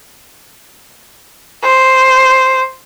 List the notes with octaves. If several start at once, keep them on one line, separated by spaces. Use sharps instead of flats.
C5